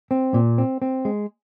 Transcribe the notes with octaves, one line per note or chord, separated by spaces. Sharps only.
C4
A#2
C4
C4
G#3